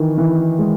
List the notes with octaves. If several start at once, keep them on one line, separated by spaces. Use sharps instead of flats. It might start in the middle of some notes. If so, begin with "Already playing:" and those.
Already playing: D#3 E3
E3
G#3